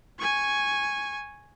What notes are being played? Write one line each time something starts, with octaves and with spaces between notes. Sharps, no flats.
G#5 C#6